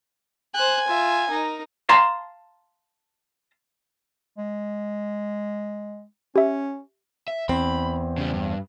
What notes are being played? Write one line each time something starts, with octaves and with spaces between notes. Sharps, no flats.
C5 G#5 F#6
F4 E5
D#4 A#4
F5 A5 A#5 C6
G#3
C#4 G4 E5
E5
E2 C4 B5
C#3 G3
G2